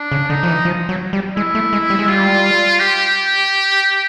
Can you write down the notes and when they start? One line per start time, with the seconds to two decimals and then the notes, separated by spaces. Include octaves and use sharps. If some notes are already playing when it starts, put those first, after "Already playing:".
Already playing: D4
0.12 C#3
0.30 D3 D#4
0.43 F3
0.48 E3
0.65 F3
0.89 F#3
1.13 G3
1.36 G#3 E4
1.55 A3
1.73 G#3
1.90 G3
1.99 G#3
2.08 G3 F4
2.79 G4